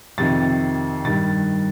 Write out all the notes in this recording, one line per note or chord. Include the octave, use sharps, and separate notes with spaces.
F2 C3 D#3 A6
G2 D#3 A6